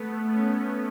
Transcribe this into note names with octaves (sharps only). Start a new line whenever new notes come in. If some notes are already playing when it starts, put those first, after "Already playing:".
Already playing: A3 B3
B3 C#4